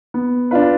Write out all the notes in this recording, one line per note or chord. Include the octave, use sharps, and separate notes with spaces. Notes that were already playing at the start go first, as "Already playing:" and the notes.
B3
D4 F4 B4